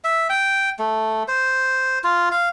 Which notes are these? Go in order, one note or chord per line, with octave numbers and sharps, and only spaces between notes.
E5
G5
A3
C5
F4
F5